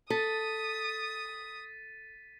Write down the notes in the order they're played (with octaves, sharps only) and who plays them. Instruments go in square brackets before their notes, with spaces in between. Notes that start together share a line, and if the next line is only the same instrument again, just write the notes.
[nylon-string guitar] A4 [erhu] D#6 [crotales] A6 B6 D#7